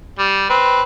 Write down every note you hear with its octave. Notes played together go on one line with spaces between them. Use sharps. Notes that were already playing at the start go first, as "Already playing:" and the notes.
G3
C4 B4